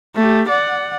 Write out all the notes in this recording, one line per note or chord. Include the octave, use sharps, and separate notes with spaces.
A3 G4
D5 F#5